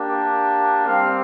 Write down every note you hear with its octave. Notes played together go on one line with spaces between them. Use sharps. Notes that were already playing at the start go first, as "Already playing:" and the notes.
Already playing: A#3 D4 G4
G3 C4 G4 F5